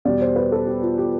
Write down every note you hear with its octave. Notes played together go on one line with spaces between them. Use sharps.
E2 B2 G3 D5
C5
B4
A4
G4
F4
G4